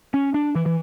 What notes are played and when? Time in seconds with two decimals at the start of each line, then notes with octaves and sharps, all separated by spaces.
0.14 C#4
0.34 D4
0.55 E3
0.66 E3